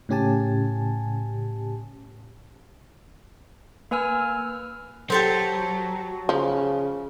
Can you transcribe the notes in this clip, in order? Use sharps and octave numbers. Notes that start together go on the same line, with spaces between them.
A2 C#3 C#4 G4 G#5 A5
A#3 B4 G#5 E6 F6
F#3 G4 A4 C5
C#3 F3